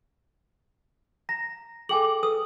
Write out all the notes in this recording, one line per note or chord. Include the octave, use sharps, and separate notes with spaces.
A#5 A#6
G#4 A4 G5 G#5 D6 F#7
A4 B4 D#6 E6